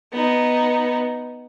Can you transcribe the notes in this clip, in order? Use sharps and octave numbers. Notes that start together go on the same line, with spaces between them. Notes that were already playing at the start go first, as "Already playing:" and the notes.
B3 D#4